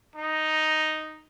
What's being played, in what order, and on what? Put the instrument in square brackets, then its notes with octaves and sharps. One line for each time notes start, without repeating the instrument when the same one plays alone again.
[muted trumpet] D#4